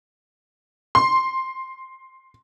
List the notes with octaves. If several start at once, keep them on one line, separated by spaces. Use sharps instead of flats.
C6